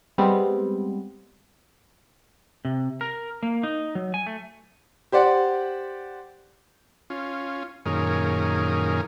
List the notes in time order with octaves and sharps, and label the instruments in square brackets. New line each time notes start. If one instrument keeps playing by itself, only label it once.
[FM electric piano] G3 G#3 B3 C4
[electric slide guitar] C3
A#4
A#3
D#4
F#3
G#5
A3
[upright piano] G4 C5 D5 F#5
[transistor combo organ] C#4 F4
F#2 A#2 D#3 C#4 G#4 A#4